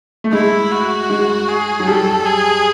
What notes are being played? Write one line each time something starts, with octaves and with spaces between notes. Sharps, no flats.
A3
G#3 E4
F#4
G#3
G#4
F#3
G3 A4
G#4